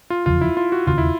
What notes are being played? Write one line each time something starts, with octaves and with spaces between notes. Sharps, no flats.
F4
F1 E2 C#3 F3 F4
E4
F4
F#4
E1 D#2 C#3 F4
E4